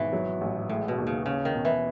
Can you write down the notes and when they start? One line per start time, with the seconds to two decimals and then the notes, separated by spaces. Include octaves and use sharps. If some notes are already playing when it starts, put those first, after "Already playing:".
Already playing: G#1 B2 E3
0.13 F#3
0.41 A1
0.69 A2 G#3
0.88 B2
0.98 D#2
1.07 C#3
1.26 C#3 C#4
1.45 D#3
1.55 B2
1.65 E3